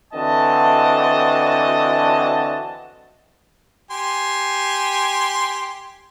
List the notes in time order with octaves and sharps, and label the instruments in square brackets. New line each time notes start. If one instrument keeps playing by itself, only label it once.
[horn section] D3 E3 C4 F#4 D#5 A5
[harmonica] G4 G#5 C6